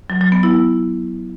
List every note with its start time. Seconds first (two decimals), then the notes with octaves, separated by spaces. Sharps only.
0.10 F#3
0.21 F#3
0.32 B3
0.43 E4